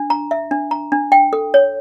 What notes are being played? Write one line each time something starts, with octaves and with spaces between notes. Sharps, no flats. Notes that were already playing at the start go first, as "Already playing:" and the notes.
Already playing: D4
A#5
E5
D4
A#5
D4
G5
A4
C#5